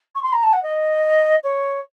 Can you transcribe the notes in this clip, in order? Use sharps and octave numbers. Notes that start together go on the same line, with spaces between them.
C#6
C6
A#5
A5
F#5
D#5
C#5